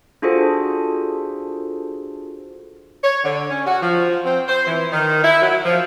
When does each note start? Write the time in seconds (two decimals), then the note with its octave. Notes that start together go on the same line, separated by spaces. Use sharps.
0.22 D4 F4 F#4 G#4 A4 C5
3.04 C#5
3.24 D3
3.51 C#4
3.67 F#4
3.82 F3
4.25 C4
4.48 C5
4.67 E3
4.93 D#3
5.23 E4
5.42 F#3
5.66 F3